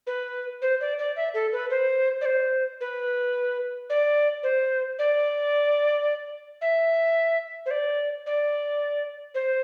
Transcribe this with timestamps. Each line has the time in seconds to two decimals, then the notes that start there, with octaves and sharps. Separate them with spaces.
0.07 B4
0.62 C5
0.81 D5
0.99 D5
1.16 E5
1.34 A4
1.53 B4
1.70 C5
2.21 D5
2.25 C5
2.81 B4
3.90 D5
4.43 C5
4.99 D5
6.61 E5
7.66 C5
7.71 D5
8.26 D5
9.35 C5